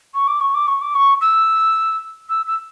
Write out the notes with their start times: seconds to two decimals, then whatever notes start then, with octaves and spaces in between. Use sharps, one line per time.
0.14 C#6
0.27 D6
0.40 C#6
0.54 D6
0.67 C#6
0.81 D6
0.94 C#6
1.21 E6
2.29 E6
2.47 E6